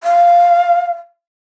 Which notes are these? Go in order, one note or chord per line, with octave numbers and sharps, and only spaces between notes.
F5